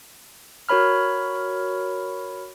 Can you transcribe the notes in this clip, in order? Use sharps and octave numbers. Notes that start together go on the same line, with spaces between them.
F#4 A#4 C#5 B5 F6